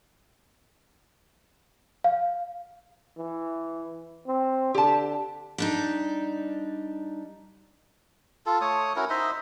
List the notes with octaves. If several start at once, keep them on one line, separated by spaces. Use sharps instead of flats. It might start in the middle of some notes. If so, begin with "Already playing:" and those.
F5
E3
C4
D3 G4 A5
G3 D4 D#4
F4 A4
A3 C#5 D#6
C#4 E4 F#4 A#4
D#4 C5 D#5 E5